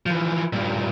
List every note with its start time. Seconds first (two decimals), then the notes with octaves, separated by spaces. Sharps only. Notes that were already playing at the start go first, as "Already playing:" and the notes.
0.06 E3 F3
0.53 G2 A#2